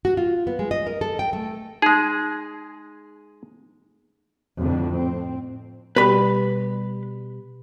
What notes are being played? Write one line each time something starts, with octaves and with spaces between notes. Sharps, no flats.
F#4
F4
B3
G#3
D#5
A#4
A4
G5
A3
G#3 D#4 G#4
F2 A2 D3
C4
B2 G3 B4 B5